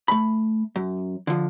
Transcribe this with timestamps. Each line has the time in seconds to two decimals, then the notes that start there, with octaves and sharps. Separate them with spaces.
0.08 A3 B5
0.76 F#2
1.27 D3 F3